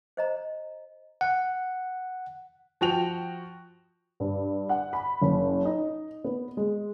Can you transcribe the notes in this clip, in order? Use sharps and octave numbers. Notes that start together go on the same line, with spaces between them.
C5 D#5 A#5
F#5
F3 F#4 G5 F7
G2
F#5
B5
F#1
D#4
B3
G#3